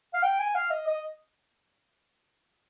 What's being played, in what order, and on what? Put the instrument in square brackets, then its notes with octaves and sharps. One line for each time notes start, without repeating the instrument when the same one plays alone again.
[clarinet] F5
G5
G#5
F5
D#5
D#5